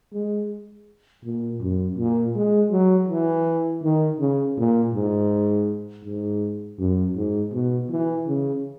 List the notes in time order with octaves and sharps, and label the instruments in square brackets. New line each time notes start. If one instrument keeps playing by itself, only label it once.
[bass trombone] G#3
A#2
F#2
A#2
G#3
F#3
E3
D#3
C#3
A#2
G#2
G#2
F#2
G#2
B2
E3
C#3